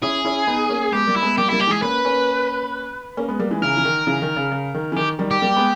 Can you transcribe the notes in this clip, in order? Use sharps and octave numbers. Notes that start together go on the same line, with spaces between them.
C#4 E4 G#4
C#4 E4
B3 D#4
A#3 C#4
G#3 B3 G4
G3 A#3
E4
G#3 B3
G3 A#3 G4
G3 A#3 E4
G4
E3 G#3 G#4
A#3 C#4 B4
A#3 C#4
A#3 C#4
G#3 B3
G3 A#3
E3 G#3
C#3 E3 A#4
E3
D#3
C#3 E3
D#3
C#3
C#3
D#3
E3
D#3 G4
D#3 G3
G4
G3 A#3
G#3 B3